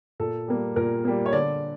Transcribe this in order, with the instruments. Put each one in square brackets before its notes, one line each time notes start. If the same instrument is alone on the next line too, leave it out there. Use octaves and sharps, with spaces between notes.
[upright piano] A#2 A4
G3 A#3
A#2 A#4
G3 A#3
C#5
D3 D5